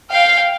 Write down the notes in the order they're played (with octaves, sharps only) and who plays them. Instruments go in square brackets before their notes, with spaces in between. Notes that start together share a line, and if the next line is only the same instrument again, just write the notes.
[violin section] F5 G5